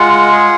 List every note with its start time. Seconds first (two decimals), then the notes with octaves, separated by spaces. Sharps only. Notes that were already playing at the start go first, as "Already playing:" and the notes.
Already playing: G#3 F4 F#5
0.32 G#4